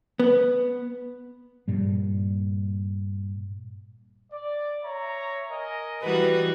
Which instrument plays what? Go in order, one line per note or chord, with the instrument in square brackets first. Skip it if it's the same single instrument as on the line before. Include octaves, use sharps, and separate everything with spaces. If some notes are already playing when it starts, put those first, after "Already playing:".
[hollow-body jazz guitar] B3
[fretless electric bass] G2 A#2 G3
[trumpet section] D5
C#5 E5 A#5
A#4 D#5 G#5
[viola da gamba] E3 G3 F#4 [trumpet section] B4